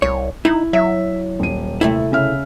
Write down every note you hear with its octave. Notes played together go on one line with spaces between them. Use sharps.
C2 C#5
D#4 E4
F#3 E5
D#1 D#7
C3 A3 E4
C#3 E5 F6